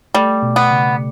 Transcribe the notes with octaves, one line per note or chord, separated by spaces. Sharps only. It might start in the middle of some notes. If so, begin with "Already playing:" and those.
G3 A3
B2
B3
C#3